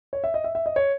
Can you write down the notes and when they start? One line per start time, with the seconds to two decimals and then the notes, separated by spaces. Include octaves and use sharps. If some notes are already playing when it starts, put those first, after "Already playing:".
0.13 C#5
0.24 E5
0.34 D#5
0.44 E5
0.55 E5
0.66 D#5
0.76 C#5